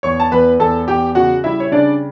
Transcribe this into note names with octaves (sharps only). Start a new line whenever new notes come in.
E2 C#5 C#6
A5
E2 B4 B5
E2 A4 A5
E2 G4 G5
C#3 F#4 F#5
G3 E4 E5
C#5
C#3 D4 D5